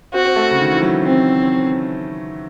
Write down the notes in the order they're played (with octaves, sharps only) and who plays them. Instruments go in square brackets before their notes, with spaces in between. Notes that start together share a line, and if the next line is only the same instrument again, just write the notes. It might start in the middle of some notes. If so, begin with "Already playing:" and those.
[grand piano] C4 [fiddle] F#4
[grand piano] C4
A3
C#3
D#3
E3
F#3
[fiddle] C4